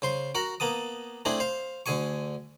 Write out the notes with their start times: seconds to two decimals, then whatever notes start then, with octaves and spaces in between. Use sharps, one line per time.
0.02 C#3 C5 C6
0.35 F#4 A#4 F#5
0.60 A#3 B3 A5 D#6
1.25 A3 C4 D4 E4 G#4
1.40 C5 F5
1.86 D2 D3 G#4 G#5 C#6